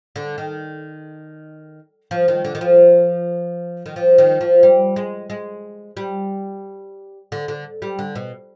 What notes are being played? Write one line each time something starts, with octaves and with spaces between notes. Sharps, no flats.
D3
D#3
F3
D#3
D3
D#3
F3
D#3
F3
D#3
F3
G3
G#3
G#3
G3
D3
D3
G3
D3
B2